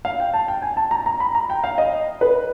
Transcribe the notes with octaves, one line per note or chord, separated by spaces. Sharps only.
F5
G5
A5
G5
G#5
A5
A#5
A#5
B5
A#5
G5
F5
D#5
B4